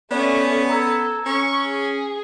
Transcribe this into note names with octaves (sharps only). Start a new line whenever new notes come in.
A3 B3 C#4 C#5 D5 F#5
A4 A#5 E6 G#6
C#4 C#6
G#4